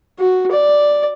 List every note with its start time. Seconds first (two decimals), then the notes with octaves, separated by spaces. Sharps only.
0.19 F#4
0.52 D5